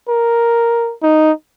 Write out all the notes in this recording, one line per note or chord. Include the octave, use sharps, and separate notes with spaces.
A#4
D#4